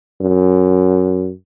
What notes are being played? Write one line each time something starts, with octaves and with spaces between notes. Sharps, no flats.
F#2